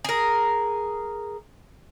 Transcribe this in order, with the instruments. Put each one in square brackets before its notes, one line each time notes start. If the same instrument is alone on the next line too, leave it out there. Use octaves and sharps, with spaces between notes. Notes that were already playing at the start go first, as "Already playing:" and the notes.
[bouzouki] G#4 A#4